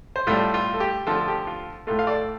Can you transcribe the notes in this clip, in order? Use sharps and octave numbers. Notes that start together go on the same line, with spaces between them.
C5
A2 G3 F4 A4
F4
A4
G4
D3 F3 A3 F4 A4
A4
G4
F4
A2 A3 F4 A4
F5
A4 D5